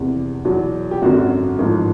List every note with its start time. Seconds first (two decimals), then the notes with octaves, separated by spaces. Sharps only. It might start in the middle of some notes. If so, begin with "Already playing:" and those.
Already playing: F1 E2 C3
0.45 E2 B2 F#3
0.91 G4
1.02 G#1 F#2 D3 F#4
1.58 A1 G#2 F3